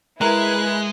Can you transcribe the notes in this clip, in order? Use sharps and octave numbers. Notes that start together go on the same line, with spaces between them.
G#3 E4 G#4 A#4 B4 F#6